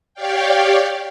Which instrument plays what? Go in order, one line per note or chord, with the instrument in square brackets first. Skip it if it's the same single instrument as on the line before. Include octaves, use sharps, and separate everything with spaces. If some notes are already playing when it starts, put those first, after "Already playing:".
[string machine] G4 C#5 D5 F5 G5